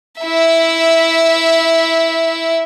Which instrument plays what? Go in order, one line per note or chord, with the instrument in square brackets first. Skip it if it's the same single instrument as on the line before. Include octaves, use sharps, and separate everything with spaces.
[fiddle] E4 E5